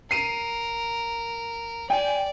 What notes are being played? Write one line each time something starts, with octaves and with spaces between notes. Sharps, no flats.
A#4 C7 D#7
D5 G5 G#5